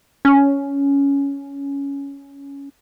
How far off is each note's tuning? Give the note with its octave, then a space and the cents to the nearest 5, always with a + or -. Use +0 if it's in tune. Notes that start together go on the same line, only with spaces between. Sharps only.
C#4 +10